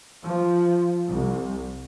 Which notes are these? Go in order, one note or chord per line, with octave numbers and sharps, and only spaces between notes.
F3
C2